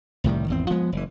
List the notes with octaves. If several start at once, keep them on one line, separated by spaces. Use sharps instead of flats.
C2 A2 D#3 G3
G#1 E2 C4
F3 G#3 B3
F#1 E3